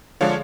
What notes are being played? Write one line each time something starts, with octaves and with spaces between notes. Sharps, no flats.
D3 F3 G#3 D4 C#5 F5